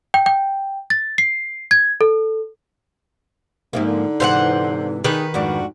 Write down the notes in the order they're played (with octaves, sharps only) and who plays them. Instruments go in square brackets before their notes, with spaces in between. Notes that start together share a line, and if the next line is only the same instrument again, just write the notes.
[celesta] G5
G5
A6
C7
G#6
A4
[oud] G#2 F3 A#3 [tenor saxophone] C3 [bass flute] D#4
[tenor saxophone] D3
[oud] G#2 C3 E3 [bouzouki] C5 F5 F#5
[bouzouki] D#3 B4 [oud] D#4 G4 G#4
[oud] F2 G#2 D4 [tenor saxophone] F#4